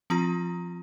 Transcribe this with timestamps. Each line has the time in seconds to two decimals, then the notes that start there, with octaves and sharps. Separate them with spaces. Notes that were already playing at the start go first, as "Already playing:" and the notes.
0.10 F3 C4 F4 A#5